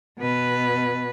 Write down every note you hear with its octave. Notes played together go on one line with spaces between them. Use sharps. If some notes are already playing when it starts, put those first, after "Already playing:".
B2 B4